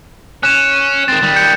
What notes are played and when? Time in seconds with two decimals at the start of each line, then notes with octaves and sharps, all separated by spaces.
0.43 C#4 F#6 E7
1.08 D#3 C4 A6
1.22 D#3 G3
1.36 G6 C#7